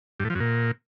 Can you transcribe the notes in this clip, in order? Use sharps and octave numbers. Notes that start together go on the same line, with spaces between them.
G2
A2
F3
F#2
A#2